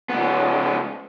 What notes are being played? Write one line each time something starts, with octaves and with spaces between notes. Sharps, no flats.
C#2 B3